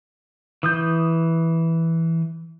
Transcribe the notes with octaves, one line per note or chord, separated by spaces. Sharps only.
E3 D#6 G6